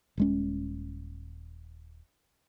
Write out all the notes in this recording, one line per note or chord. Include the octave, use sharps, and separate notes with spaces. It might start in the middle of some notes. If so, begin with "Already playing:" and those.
D#1 G#3 C#4